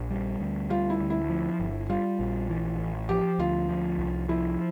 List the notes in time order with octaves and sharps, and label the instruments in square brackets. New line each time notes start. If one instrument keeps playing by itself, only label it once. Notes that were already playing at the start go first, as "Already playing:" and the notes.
Already playing: [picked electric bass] A#1
G3
D2
[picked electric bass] G3 [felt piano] F4
[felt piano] E4
[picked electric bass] D2
[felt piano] E4
[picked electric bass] F3
G1
[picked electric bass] G3 [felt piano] F4
[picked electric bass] A#1
E3
A1
[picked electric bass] F3 [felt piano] G4
[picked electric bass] D2 [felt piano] F4
[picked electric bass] F3
C2
[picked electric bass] F3 [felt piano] E4